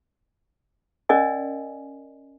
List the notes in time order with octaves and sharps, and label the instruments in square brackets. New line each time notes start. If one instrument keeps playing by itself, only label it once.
[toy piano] C#4 A#4 D5 D#5 G#5